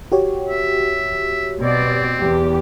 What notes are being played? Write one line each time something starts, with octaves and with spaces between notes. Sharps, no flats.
F#4 G4 C#5
E5
B2 C4 D5
E2 G4